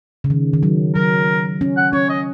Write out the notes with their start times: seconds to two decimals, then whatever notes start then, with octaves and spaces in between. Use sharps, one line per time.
0.24 C#3
0.30 D#3
0.54 D#3
0.63 F#3
0.95 F#3 A#4
1.61 C#4
1.77 F#5
1.93 C#4 C#5
2.09 D#5